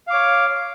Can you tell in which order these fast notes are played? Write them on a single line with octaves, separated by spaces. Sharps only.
F5 D6 C#5